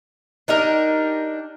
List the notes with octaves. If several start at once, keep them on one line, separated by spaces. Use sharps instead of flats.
D4 D#4 G4 A#4